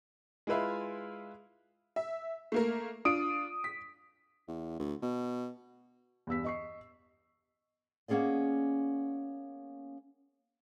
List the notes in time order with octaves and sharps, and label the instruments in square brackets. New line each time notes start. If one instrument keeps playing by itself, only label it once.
[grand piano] G#3 E4 F4 B4 E5 F5
[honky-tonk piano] E5
A3 A#3 A#4
[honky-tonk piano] D4 F4 [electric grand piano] D#6 D7
[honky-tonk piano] B6
[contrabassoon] E2
D2
B2
[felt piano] E2 G2 E6 B6
D#5 C#6 C7
[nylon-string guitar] A#3 B3 C#4 G#4 D5 D#5